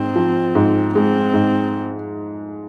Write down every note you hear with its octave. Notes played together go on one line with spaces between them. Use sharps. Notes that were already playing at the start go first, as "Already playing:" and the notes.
Already playing: G#2 C4
F3
G#2
G#3 C4
G#2